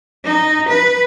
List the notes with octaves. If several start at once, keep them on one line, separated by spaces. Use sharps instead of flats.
D#4
B4